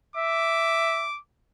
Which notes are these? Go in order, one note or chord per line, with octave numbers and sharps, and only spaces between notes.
E5 D6